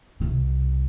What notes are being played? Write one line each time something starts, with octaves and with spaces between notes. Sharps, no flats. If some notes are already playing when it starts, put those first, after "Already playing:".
C2 B2